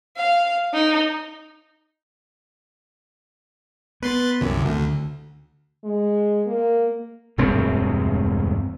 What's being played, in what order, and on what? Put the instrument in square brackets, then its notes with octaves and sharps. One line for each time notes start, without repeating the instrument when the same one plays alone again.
[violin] F5
D#4
[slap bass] B3 [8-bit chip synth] B4 C6 A6
[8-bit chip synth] C2 F#2 [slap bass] D3
[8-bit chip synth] D2 [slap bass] D3
[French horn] G#3
A#3
[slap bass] E1 D2 G2 C4